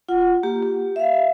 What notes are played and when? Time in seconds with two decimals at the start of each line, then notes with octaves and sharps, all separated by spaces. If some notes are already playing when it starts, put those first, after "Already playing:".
0.09 F4 F#5
0.43 A#3 G4
0.63 G4
0.96 E5 F5